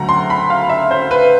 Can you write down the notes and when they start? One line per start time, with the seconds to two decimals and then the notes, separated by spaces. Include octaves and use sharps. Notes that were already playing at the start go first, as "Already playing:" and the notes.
Already playing: D2 D3 F#3 A3 F#5 A#5
0.09 C6
0.30 B5
0.50 F5
0.69 E5
0.91 C5
1.11 B4